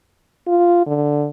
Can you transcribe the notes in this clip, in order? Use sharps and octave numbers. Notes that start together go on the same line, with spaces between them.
F4
D3